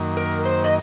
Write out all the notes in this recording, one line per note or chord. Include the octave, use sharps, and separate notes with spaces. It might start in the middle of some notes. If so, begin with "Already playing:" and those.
Already playing: F#2 D#3 A#3
A#4
C5
D#5